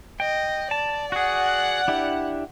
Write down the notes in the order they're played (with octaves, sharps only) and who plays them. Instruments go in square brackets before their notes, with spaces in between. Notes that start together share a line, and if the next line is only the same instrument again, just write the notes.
[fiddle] D#5 [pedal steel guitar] G5
[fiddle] D5 [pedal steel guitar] A5
[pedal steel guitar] F#4 G#4 [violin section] F#5
[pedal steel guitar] D4 E4 G4